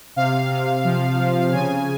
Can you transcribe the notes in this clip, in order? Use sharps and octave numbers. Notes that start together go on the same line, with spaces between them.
C3 F5
C3
F3
F3
C#3 G#5